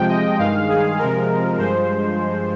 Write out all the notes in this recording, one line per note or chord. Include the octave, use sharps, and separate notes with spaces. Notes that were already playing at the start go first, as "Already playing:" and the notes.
Already playing: C3 F3 G#3 G5
D#5
G2 D#3 G#3 F5
G#4
C3 F3 G#3 A#4
G2 F3 G#3 C5